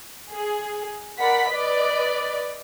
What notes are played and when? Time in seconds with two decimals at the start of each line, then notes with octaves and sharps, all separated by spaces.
0.32 G#4
1.19 A#4 D5 F#5 B5 B6
1.50 B4 D5 D#5